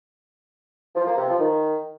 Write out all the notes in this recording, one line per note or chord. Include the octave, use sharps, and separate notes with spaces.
F3
A#3
C3
F3
D#3